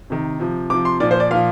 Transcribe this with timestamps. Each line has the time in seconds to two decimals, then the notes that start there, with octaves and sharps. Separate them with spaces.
0.10 C3 D#3
0.40 C3 F3
0.70 C3 F3 D6
0.85 C6
1.00 A#2 D5
1.03 F3
1.11 C5
1.20 D5
1.31 A#2 F3 F5